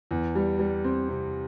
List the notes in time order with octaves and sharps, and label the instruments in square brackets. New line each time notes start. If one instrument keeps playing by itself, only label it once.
[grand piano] E2
G3
G3
C4
C3